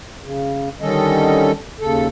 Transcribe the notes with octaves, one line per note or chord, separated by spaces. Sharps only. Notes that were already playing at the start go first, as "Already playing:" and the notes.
C#3
D3 D#3 G3 C#4 A4 D#5
D#2 C#3 A4